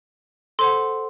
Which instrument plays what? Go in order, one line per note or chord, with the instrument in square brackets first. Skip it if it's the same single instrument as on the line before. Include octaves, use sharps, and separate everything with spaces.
[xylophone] A4 C5 F#5 C6